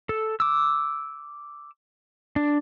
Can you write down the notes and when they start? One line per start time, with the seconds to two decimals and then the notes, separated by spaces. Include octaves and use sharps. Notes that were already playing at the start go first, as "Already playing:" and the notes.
0.09 A4
0.40 D6 E6
2.36 D4